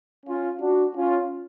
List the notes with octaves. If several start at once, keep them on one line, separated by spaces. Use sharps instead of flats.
C#4 F4
D4 F#4
C#4 F4